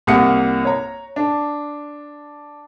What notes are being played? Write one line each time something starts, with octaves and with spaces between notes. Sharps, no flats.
C2 A#3 F#5 D#6 C#7
C#5 A#5
D4